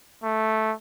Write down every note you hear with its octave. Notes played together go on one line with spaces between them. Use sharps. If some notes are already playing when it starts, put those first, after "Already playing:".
A3